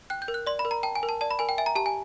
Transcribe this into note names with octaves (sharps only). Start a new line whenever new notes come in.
G5 F#6
G6
A#4
F#6
D5 C6
B5
A#4
A#5
G5 A5
G#5
A#4
A5
D5 A5
B5
A#4 G#5
G5
E5 G#5
A#5
G4 A5
G#5